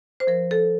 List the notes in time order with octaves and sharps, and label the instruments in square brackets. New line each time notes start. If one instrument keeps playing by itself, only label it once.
[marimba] C5
F3 A#4
A4